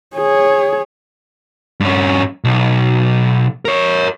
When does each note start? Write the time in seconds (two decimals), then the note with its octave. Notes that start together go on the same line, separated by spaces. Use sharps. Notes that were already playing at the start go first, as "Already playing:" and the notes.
0.15 G#4 C#5
1.80 G2 C#4
2.44 B1
3.65 A#4 C#5